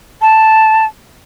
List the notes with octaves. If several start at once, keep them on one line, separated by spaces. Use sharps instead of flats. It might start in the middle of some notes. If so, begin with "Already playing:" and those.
A5